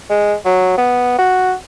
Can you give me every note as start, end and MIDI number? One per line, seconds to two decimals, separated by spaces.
0.10 0.35 56
0.45 0.74 54
0.78 1.18 59
1.18 1.54 66